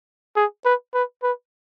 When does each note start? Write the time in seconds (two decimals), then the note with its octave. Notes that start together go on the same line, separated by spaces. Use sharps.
0.36 G#4
0.65 B4
0.94 B4
1.23 B4